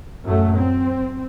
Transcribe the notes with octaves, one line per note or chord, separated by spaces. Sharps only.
F#2 A2 F#3 A3
C4